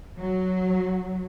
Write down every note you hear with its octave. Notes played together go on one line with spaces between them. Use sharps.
F#3